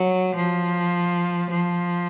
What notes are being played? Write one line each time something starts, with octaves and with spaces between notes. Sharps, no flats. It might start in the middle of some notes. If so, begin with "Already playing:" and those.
Already playing: F#3
F3
F3